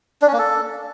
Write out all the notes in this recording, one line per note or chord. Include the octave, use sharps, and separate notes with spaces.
D4
C#4
A#3
A4